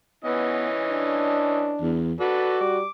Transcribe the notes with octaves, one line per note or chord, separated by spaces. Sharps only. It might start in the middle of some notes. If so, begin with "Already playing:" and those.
E3 B3 C#4 D#5
D4
E2
F#4 A4 B4 D5
G3 D6